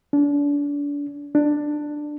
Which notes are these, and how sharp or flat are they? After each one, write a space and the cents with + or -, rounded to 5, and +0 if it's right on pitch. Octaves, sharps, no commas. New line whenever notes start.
D4 -35
D4 +10